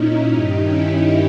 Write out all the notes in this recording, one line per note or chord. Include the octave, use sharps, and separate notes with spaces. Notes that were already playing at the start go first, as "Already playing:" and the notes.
Already playing: A#2 C#4 D#4 E4
G2 D#3 D#4 G4
C#4 E4
D#4 G4